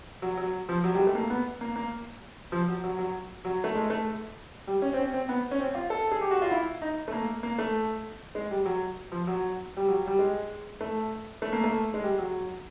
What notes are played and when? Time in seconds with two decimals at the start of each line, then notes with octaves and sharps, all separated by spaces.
0.22 F#3
0.37 F#3
0.69 F3
0.84 F#3
0.95 G3
0.99 G#3
1.07 A3
1.15 A#3
1.30 B3
1.61 A#3
1.76 A#3
2.52 F3
2.68 F#3
2.84 F#3
2.99 F#3
3.45 F#3
3.64 A3
3.75 G#3
3.90 A3
4.67 G3
4.82 C#4
4.93 C4
4.98 C#4
5.13 C4
5.29 B3
5.51 C#4
5.60 C4
5.75 F4
5.90 A4
6.12 G#4
6.21 G4
6.31 F#4
6.42 F4
6.51 E4
6.82 D#4
7.08 A3
7.12 A#3
7.43 A#3
7.59 A3
8.35 G#3
8.51 G3
8.66 F#3
9.12 F3
9.27 F#3
9.77 G3
9.88 F#3
10.07 G3
10.19 G#3
10.81 A3
11.42 A3
11.53 A#3
11.64 A3
11.94 G#3
12.03 G3
12.19 F#3